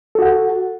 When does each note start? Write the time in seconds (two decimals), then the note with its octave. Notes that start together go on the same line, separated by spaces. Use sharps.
0.15 A4
0.19 F#4
0.22 F#5